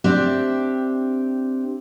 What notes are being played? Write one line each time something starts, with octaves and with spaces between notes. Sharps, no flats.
C4 D4 G4 E5